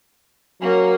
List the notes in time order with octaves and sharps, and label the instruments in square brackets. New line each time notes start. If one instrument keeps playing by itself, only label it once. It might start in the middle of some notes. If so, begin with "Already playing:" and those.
[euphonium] F#3 [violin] A#3 C#4